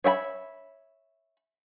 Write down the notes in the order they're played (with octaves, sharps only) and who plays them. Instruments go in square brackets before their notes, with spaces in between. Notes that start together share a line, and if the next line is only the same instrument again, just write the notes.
[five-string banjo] C#5 E5 G5 B5